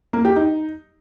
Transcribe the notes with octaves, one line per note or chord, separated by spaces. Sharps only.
A#3
G4
D#4